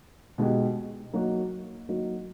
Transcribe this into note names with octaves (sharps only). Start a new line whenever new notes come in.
B2 G#3 B3 D#4 G4
F#3 A#3 D#4 F#4
F#3 A#3 D#4 F#4